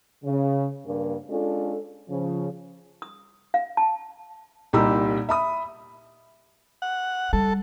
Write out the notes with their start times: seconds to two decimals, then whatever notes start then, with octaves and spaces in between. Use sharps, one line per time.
0.24 C#3
0.85 G2 C#3 A#3
1.30 G#3 C#4 D4 F4 A4
2.10 C#3 F3
3.02 D#6
3.54 F5
3.77 A5
4.73 C2 A#2 D#4 G4 B5 E6
5.29 E5 B5 D#6
6.82 F#5
7.33 G3 A4